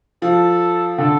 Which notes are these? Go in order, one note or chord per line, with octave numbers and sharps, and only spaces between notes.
F3 A4
D3 A4